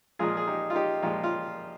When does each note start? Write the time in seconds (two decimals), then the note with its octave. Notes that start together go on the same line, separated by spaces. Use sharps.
0.19 A#2 F3 G#3 F4 G#4
0.37 G#4
0.47 D#4 G4
0.70 F4
0.75 D#4 G4
1.02 A#2 F3 G#3 F4
1.24 F4